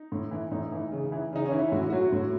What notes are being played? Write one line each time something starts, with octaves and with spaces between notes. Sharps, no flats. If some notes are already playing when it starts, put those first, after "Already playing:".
Already playing: D#4
A2
E3
A2 D#4
E3
C#3
E3
C#3 D#4
C#4
E3
E4
A2 F#4
E4
F#3 F#4
A2